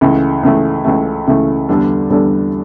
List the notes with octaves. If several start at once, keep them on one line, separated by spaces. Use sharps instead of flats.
C#2 C#3 E3 A3
C#2 C#3 E3 A3
C#2 C#3 E3 A3
C#2 C#3 E3 A3
E2 D3 G3 D4 A4
E2 D3 G3 D4 A4